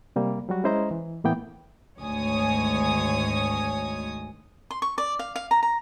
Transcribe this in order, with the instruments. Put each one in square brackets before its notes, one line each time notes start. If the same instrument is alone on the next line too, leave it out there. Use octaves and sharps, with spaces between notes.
[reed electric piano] C3 G3 A#3
F#3 G3 F#4
G#3 C#4 E4 C5 D#5 A#5
E3
A2 E3 A#3 B3 G5
[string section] G#1 D2 D#3 C#5 G#5 D#6
[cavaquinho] C6
C#6
D5
F5
F5
A#5
A#5